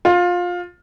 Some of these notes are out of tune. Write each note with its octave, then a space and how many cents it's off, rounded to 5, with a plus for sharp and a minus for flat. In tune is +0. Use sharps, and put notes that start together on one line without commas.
F4 +20